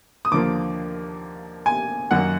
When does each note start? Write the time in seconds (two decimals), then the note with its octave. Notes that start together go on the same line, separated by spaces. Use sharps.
0.25 D#6
0.32 D#2 D3 F3 A#3 D6
1.66 G#5
2.11 F#2 D#3 F#3 A#3 F#5